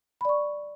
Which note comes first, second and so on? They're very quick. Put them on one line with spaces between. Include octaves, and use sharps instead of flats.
B5 D5 C#6